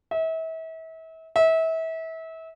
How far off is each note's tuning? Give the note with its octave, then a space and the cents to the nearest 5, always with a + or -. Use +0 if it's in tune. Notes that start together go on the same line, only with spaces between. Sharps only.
E5 -35
E5 -30